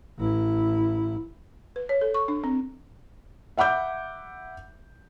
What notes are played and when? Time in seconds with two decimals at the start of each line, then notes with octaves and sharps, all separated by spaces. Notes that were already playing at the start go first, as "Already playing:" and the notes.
0.18 A1 E4
1.76 B4
1.89 C#5
2.01 A4
2.14 C#6
2.28 D4
2.44 C4
3.57 E5 F#5 B5 D6 G6